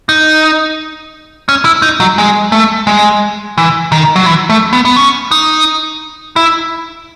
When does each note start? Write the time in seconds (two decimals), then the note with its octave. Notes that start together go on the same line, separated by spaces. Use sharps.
0.09 D#4
1.49 C#4
1.65 E4
1.82 D#4
2.00 F#3
2.18 G#3
2.52 A3
2.87 G#3
3.58 E3
3.92 D#3
4.16 F#3
4.26 E3
4.49 A3
4.73 B3
4.85 B3
4.96 C#4
5.31 D#4
6.36 E4